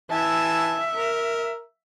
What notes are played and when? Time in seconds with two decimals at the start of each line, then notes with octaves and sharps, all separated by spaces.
0.11 E3 E5 G#5 A5
0.95 A#4